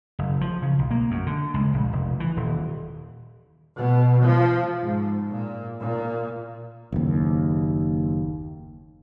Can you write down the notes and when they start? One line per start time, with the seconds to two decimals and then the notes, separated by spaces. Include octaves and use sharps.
0.19 F#1
0.41 F3
0.62 C#3
0.79 B1
0.91 A#3
1.11 F#2
1.26 D3
1.54 C#2
1.74 A#1
1.93 F1
2.20 E3
2.37 D#1
3.77 B2
4.25 F3
4.81 G#2
5.31 A#2
5.80 A#2
6.92 F#1 D#2